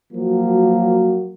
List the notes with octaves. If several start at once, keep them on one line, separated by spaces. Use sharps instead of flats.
F3 F#3 A#3 F#4